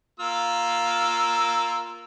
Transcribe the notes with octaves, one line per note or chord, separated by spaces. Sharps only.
A#3 F4 E6